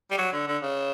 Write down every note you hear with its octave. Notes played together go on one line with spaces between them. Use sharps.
G3
F#3
D3
D3
C#3